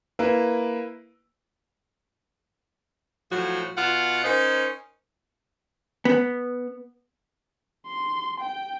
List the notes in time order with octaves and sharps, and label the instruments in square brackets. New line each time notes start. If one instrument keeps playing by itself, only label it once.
[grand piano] A#3 E4 B4
[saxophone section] A2 F3 F#3 F#4
B2 F4 F#5
C#4 D#4 A#4 C5
[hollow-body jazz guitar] B3
[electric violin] C6
G5